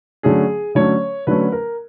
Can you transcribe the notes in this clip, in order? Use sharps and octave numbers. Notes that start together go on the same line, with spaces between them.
D3 F#3 A3 C#4 G#4
D3 F#3 A3 C#4 C#5
D3 F#3 A3 C#4 B4
A#4